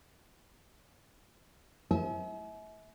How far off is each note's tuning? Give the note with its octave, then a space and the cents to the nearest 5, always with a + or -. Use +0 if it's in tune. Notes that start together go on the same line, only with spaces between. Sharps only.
E5 -35 G#5 +40